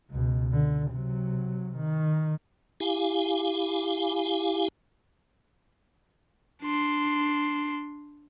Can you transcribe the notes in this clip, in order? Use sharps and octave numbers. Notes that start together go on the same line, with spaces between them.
C#2 B2
D3
C3 F#3
D#3
E4 G4 F5 G#5
D4 C6